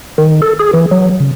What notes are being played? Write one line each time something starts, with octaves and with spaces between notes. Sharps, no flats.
D#3
A4
G#4
E3
F#3
C#3